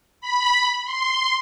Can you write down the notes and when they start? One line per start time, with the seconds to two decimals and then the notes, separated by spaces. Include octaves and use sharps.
0.21 B5
0.85 C6